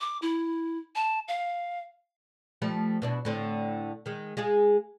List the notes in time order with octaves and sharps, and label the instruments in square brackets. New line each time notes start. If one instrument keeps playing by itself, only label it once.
[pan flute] D6
E4
A5
F5
[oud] F3 G3 A3
B2 D4 E4
A2 D3 C4
D#3 G#3
G#3 F4 G#4